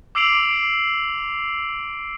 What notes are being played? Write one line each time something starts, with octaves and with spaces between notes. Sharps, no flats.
D6 E6 C7 D7 F7 F#7